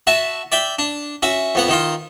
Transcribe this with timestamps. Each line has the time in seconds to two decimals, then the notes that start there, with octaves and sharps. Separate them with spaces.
0.07 F#4 E5 A5
0.52 D5 E5 G5
0.79 D4
1.22 C#4 F#4 E5
1.55 F2 B3 F#5
1.68 D#3 D#4 F4